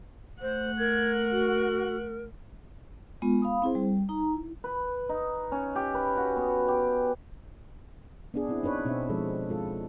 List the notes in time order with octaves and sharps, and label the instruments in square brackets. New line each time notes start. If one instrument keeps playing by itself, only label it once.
[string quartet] A3 F#5 F#6 [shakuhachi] C5
[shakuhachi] A#4 [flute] G#6
[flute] F#4
[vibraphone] G#3 B3 F4
F5 B5 D#6
C4 E4 G#4 C5
G3
D#4 A#5
E4
[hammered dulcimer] B4
D#4
C#4
G4
B4
F#4
B3
G4
[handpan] B3 D4 G#4
C4 E4
D4 D#4 B4 C#5
B2 C4 D4 D#4 E5
F3 G#3 A4
G#3 F4 A4